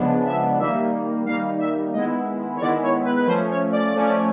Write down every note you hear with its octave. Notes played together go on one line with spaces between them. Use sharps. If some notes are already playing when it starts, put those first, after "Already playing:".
Already playing: C#3 F3 G#3 B3 D4
E5
D#3 G3 A#3 D#4 E5
D#3 G3 A#3 D#4 F5
E5
D#3 G#3 B3 E4 D#5
C#5
D#3 G#3 B3 E4 D5
C#5
B4
B4
F3 A3 C#4 C5
C#5
D5
F3 A3 C#4